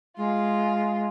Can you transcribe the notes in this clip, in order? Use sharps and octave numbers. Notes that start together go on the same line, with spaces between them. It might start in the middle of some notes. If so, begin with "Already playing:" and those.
G#3 F4